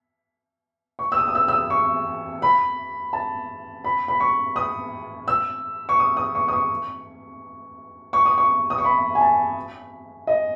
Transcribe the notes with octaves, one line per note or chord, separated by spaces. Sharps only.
C#6
E6
D#6
D#6
E6
E6
D#6
C#6
B5
A5
B5
B5
C#6
D#6
E6
C#6
D#6
D#6
C#6
D#6
C#6
C#6
D#6
C#6
D#6
C#6
B5
G#5
A5
D#5